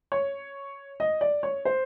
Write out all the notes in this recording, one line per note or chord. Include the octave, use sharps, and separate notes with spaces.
C#5
D#5
D5
C#5
C5